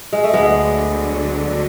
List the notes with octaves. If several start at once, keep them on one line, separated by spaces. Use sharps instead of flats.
G#3
A3
D2 D3 F#3 G#3 B3